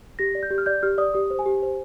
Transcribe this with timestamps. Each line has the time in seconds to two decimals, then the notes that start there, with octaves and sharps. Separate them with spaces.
0.19 G4 A#6
0.35 D5
0.43 G6
0.51 G4
0.58 F6
0.66 D5 G6
0.83 G4 F6
0.98 D5 D#6
1.14 G4 D#6
1.30 C5
1.39 G#5
1.46 G4
1.63 C5